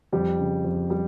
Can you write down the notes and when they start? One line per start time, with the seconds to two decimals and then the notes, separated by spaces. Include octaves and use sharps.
0.12 F2 G3 G4
0.39 C#3
0.65 F2
0.90 G3 G4